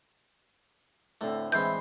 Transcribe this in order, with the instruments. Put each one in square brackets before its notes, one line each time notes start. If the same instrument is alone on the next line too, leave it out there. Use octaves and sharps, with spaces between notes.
[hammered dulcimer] A2 D3 C4 [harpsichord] A3
[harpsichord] E3 G#3 C4 [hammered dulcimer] E4 B4 C6 [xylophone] G6